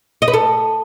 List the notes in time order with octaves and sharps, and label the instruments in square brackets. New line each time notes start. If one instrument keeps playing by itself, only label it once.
[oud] D#5
B4
A4